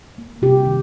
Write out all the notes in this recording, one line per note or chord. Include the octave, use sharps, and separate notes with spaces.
A#3
C3 G4
D#3